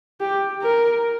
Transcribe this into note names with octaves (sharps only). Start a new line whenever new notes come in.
G4
A#4